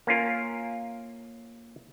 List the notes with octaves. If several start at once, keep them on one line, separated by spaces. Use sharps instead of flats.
A#3 C#4 F4 A#4